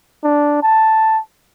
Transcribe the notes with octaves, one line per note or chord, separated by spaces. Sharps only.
D4
A5